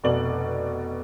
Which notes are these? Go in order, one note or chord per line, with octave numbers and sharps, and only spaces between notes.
F1 B2 D5 F#7